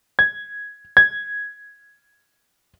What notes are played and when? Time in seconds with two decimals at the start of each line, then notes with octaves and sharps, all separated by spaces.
0.19 G#6
0.97 G#6